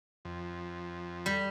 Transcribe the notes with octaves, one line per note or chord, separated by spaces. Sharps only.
F2
G3